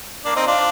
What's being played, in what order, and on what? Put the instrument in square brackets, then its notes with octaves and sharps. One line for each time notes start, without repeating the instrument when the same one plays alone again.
[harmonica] A#3 D4
C4 D#4
D4 F4